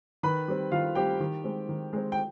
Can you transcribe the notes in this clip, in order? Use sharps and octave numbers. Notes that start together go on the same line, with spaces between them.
D#3 B4 B5
G3 C4
D#3 F4 F5
G3 C4 G4 G5
D#3
G#3 C4
D#3
G#3 C4
G5